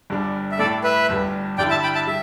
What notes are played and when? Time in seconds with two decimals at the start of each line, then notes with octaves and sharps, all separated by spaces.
0.10 G1 G2 G3 D4
0.52 E5
0.59 A2 A3 E4 G4 A4 D5
0.84 B4 E5
1.09 G1 G2 G3
1.58 G2 D3 G3 E4 D5 G5
1.71 E5 A5
1.83 G5 B5
1.95 E5 A5
2.07 G3 E5